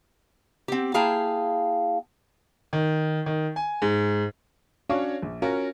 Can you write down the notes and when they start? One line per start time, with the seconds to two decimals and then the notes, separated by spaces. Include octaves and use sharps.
0.68 C4 G4
0.94 A#3 E4 G#4 F5 G5 A5
2.73 D#3
3.26 D#3
3.56 G#5
3.82 G#2
4.89 C#4 D4 F#4 C#5 F5
5.22 A#1
5.42 C#4 F4 F#4 A#4